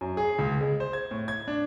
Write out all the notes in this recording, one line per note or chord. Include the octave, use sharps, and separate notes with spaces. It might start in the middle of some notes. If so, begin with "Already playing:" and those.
F#2
G#4
C#2
G#3
C5
G#6
A2
G#6
D4